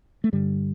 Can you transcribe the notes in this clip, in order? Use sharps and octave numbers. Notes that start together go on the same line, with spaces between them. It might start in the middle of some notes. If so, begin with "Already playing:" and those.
A3
G2 D3 G3